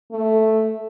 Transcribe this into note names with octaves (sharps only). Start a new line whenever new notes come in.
A3